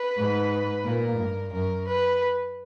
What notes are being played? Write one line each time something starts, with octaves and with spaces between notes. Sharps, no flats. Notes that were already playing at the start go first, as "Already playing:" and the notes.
Already playing: B4
G#2
A#2 A#4
G2
F#2 A#4
B4